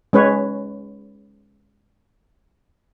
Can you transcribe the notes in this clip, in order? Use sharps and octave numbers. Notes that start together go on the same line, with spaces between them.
G#3 C#4 B4 C#5